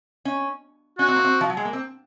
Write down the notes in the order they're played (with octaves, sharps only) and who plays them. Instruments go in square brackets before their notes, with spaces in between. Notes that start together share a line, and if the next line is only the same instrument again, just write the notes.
[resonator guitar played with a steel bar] C#4
[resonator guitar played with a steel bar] C#4 [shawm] F#4
[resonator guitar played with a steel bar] C4
A#3
C4
F3
F#3
G#3
A#3
C4